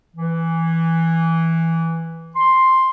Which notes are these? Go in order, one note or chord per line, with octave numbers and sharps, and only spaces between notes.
E3
C6